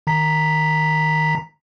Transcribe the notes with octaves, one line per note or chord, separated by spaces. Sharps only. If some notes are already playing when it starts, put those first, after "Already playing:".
D#3 A#5 B6